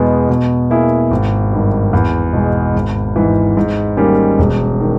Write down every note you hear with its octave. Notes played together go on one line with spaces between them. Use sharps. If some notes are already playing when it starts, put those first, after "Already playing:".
Already playing: E2 B2 G#3 B3
B2
A#3 E4 G#4
G#1
G2 D#3
E2
B2 G#3
G#1
G#2 E3
G#2
D#3 G3 A#3 C#4
E1
D#3